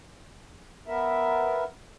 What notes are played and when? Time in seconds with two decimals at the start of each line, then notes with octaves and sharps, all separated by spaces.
0.88 B3 A#4 E5